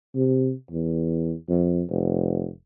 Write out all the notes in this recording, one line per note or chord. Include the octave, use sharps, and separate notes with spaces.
C3
E2
F2
F1